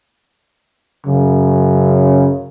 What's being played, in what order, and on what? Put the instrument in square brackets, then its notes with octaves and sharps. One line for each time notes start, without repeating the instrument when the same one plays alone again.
[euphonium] F#2 [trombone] C#3